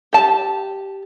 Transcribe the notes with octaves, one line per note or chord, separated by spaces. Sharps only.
G4 A5